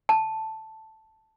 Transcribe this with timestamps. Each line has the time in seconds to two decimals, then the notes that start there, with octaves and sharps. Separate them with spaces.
0.09 A5